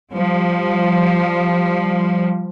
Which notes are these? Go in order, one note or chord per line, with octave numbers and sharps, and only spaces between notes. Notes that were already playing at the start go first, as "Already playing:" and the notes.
F3 G3